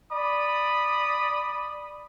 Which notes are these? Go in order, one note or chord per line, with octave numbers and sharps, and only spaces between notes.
D5 B5 D6 D#6